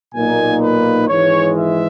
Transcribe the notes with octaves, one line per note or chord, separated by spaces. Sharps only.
B1 A#2 A#3 D#4 G#5
B4
G#1 G#2 E3 G#3 C#5
E5